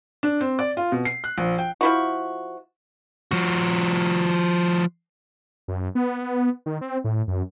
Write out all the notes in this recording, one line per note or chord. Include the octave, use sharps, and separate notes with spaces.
D4
C4
D5
F4
B2
C7
F#6
A#1
G5
F3 E4 F#4
F3 F#4
F#2
B3
D#3
C4
A2
F#2